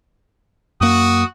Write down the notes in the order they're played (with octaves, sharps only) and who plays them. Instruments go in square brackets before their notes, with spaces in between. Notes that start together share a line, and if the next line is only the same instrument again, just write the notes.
[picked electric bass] F#2 A#3 [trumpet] F#4 [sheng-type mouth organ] D#6